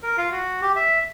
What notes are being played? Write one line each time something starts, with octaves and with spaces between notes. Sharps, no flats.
A#4
F4
F#4
G4
E5